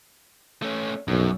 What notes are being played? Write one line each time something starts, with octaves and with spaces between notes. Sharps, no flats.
A3 C#4
B1 F#2